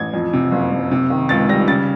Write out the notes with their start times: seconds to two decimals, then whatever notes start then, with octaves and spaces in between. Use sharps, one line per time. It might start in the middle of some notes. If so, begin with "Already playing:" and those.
Already playing: A1 G#6
0.14 F2
0.33 C3
0.52 F#1
0.71 F#1
0.91 C3
1.10 D#3
1.29 C#2 A6
1.49 G3 A#6
1.68 C#3 A6